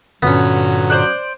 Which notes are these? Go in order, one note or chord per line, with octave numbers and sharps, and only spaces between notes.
G2 A#2 D3 F#3 B3 C#4
C5 D5 F#6